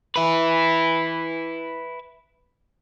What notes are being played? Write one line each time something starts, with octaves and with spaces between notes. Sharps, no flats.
E4 B4